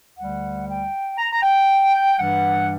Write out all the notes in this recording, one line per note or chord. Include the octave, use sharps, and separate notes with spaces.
D2 D3 G3 F#5
G5
A#5
A#5
G5
G2 E3 G3 F#5